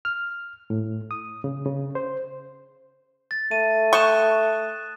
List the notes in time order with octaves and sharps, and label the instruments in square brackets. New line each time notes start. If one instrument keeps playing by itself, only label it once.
[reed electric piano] F6
A2
D#6
C#3
C#3
C5
[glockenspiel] A6
[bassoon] A3 [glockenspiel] D#7
[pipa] G5 C#6 [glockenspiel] D#6 F#6 E7